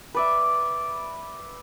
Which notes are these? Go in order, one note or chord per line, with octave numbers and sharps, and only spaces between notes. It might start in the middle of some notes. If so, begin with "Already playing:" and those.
B4 D5 E5